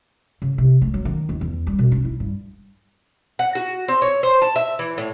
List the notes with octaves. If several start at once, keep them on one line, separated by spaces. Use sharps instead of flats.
C#3
C3
A3
F#3
D#3
D#2
E2
G3
B2
D4
E4
G2
F#5
F#4
C4
C#5
C5
A5
E5
E3
A2